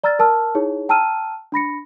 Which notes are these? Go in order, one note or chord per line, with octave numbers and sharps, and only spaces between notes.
D5 A#5 E6 F6 A6
A#4 A5 E6 F6
D#4 E4 G#4 C#5
G5 A5 A#5 E6 F6 D#7
D4 B5 A#6 C#7